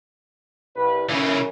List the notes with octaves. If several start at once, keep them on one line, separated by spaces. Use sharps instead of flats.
C2 B4
F#2 C#3 E3